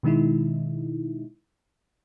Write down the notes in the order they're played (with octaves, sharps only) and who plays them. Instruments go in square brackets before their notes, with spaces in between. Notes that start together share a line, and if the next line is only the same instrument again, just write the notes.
[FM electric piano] B2 D#3 G#3 D#4 E4